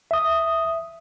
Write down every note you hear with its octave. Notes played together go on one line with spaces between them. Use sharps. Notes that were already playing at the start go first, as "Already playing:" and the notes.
E5 D#6